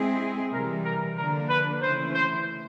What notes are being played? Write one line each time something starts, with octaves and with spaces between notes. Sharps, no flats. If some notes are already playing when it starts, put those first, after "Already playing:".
Already playing: G#3 C4 E4 G#4
C3 E3 G3 A#4
A#4
D3 F3 A#3 D4 A#4
B4
C#3 E3 A3 C#4 E4 C5
C5